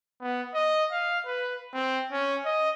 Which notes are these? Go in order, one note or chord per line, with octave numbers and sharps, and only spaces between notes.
B3
D#5
F5
B4
C4
C#4
D#5